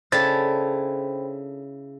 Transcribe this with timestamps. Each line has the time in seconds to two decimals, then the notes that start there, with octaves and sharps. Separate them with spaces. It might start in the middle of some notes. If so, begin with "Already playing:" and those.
0.12 C#3 D4 E4 A4 C5 G5 B5 A6